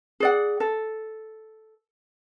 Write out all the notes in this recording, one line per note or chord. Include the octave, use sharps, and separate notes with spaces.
G#4 D5 F#5
A4